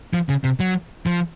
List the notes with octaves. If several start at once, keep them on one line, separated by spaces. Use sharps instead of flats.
F3
C#3
C3
F#3
F3